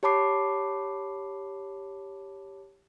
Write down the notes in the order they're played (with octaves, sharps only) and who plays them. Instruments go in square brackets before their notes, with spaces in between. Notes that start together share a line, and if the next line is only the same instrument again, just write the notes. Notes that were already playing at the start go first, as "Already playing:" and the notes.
[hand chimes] G4 C#5 A5 B5 D6 C7